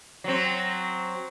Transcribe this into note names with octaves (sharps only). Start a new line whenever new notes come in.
F#3 C4